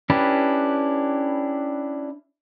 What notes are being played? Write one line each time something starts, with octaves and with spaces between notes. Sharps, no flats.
C#4 D4 E4 G4 B4